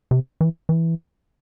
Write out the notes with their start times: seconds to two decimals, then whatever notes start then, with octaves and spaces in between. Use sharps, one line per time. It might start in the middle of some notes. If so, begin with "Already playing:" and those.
0.11 C3
0.41 E3
0.69 E3